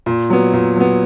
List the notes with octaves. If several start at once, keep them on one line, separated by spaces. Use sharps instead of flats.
A#2
F#3 B3
A#2
F#3 B3